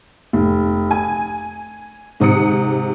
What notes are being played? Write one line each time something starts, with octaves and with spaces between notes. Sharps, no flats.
F1
G#5
G#2 C3 D#6 C#7